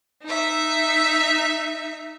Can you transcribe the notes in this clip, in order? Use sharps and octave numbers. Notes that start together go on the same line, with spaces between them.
D#4 E5